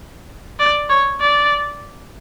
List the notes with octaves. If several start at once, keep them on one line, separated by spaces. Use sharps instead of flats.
D5
C#5
D5